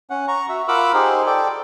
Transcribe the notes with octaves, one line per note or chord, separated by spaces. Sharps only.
C#4 F#5
A#5 C#6
F#4 E5
F4 A#4 F#5 B5 D6 E6
D#4 G4 G#4 C5
A4 D5 G5